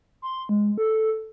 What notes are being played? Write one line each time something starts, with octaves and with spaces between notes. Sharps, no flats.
C6
G#3
A4